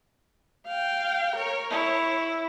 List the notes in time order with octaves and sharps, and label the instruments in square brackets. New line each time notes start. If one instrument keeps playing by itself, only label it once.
[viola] F5 G5
A#4 C#5
[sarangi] E4 [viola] C#5